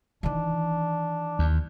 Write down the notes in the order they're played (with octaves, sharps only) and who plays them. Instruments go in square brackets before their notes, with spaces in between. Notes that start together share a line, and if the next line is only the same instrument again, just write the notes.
[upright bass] D#3 E3 [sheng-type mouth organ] D4
[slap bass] D#2